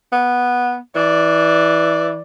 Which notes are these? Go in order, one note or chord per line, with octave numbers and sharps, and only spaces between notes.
B3
E3 D5